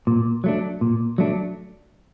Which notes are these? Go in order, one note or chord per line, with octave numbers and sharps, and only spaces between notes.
A#2
F#3 A3 D4
A#2
F#3 A3 D4